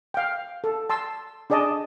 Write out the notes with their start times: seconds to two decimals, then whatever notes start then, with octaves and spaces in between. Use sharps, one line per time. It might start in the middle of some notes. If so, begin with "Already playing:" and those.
0.14 F5 G5
0.64 A4
0.90 A5 C6 E6
1.50 D4 G#4 D5 D#5 A5